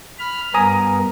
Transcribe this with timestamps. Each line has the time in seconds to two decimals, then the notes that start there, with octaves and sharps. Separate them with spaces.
0.19 B5 F6
0.54 G2 B3 A#4 G#5 A#5 D#6